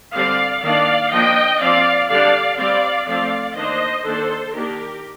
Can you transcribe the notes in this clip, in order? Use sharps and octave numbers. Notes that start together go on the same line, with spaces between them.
D3 G3 C4 D5 F5
D#3 A#3 D4 D5 F5
F3 A#3 D4 D#5 G5
F3 C4 D5 F5
D3 G3 D4 D5 F5
G3 C4 D5 F5
F3 A3 C4 D5 F5
D#3 A#3 D4 C5 D#5
D#3 A#3 D4 A4 C5
D#3 A#3 D4 G4 A#4